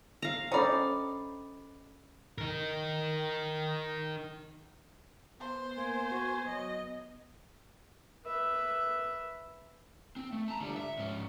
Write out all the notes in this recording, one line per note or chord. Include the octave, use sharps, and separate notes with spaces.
F5 A#5
C#4 D#4 A4 C5 D5 G5 B5
D#4 A#4
B3 C5
A#3 G#5
F#4
F#3 D#5
B4 E5
C4
A3
A5 A#5
D3 G3
E5
G#2 C#4